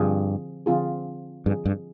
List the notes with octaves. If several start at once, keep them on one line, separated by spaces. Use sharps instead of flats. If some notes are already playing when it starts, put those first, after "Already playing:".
Already playing: G2 D3 F3 C4 F4 G#4
D3 F3 C4 F4 G#4
G2 D3 F3 C4 F4 G#4
G2